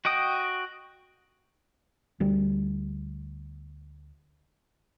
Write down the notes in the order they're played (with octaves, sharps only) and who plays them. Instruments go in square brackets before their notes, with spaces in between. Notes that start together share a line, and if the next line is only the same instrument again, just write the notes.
[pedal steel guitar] F#4 D#5 G5 D#6
[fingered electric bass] D2 G3